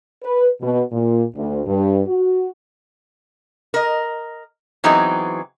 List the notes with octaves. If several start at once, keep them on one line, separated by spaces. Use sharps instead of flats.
B4
B2
A#2
D2
G2
F#4
A#4 D#5
E3 F#3 B3 C4 D#4 G#4